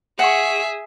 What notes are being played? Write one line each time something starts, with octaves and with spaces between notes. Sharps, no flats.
G#4 E5 F#5 C#6